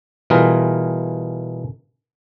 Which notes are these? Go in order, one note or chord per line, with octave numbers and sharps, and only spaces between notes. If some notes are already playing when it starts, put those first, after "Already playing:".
B2 E3 G3 F4 G#4 A#4